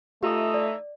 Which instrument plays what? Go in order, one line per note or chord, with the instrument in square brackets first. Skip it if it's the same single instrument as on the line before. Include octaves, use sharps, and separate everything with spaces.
[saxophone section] E3 D#4 E5 [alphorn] A3 [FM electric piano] F4 D#6 [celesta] G4
[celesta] D5